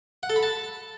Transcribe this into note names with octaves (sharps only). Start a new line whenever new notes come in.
F#5
A4
B5
A5